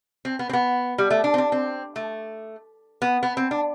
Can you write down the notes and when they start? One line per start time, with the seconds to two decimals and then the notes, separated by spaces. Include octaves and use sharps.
0.25 C4
0.39 B3
0.49 C4
0.53 B3
0.98 G3
1.10 A3
1.24 D4
1.34 C4
1.38 D4
1.52 C4
1.96 A3
3.02 B3
3.23 B3
3.37 C4
3.51 D4